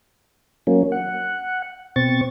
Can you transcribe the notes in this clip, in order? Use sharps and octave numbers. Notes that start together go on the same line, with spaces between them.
F#3 A#3 C#4
F#5
B2 C4 C#6 A6